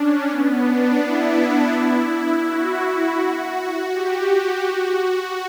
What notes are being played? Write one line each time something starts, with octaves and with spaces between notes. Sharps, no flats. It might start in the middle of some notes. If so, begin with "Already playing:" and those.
Already playing: C#4 D4
B3
D4
E4
F#4
F#4
G4
F#4